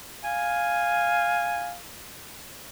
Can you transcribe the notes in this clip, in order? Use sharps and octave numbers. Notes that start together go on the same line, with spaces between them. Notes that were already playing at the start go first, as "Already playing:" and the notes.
F5 G#5